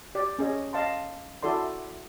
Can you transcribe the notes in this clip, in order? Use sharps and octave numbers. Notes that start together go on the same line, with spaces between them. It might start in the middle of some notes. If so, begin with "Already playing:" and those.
G4 D5
C#4 G#4 D#5
D#5 F5 A5 C6
E4 F#4 A4 D5 C6